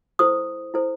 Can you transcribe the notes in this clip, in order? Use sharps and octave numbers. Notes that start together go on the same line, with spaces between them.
E4 A4 C5 D#6
E4 A4 C5